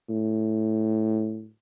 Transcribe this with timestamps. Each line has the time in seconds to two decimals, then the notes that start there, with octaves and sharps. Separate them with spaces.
0.10 A2